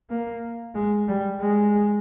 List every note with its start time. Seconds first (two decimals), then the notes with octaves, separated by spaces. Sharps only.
0.10 A#3
0.75 G#3
1.08 G3
1.40 G#3